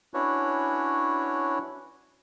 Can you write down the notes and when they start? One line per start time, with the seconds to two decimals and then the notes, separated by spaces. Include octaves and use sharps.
0.14 C#4 D4 E4 F#4 B4 C#5